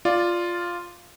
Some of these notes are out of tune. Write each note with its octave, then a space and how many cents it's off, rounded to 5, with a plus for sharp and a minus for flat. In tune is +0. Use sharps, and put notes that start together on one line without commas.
F4 +0 D5 +0